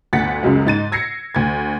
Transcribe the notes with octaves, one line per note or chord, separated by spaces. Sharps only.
G1 D2 F#5 A6 B6 C#7
C#2 F#2 C#3 F#3 G#3
G#2 D#4 A6 D#7
E6 G#6 A#6 C7 C#7
D2 G#6